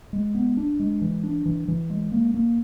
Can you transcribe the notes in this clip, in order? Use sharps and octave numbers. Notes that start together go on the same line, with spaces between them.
G#3
B3
D4
G#3
E3
D4
E3
E3
G#3
A#3
A#3